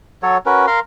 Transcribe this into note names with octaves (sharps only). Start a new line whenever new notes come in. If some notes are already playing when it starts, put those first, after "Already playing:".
F#3 F#4 A4 C#5
C#4 F#4 A#4 B4
A#4 F5 A#5 C6